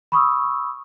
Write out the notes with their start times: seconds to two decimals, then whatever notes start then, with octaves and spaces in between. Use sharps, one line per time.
0.12 B5 C#6 D#6 E6